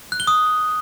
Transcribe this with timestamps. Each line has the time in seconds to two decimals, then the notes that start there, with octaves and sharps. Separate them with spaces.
0.12 F#6
0.20 G7
0.27 D#6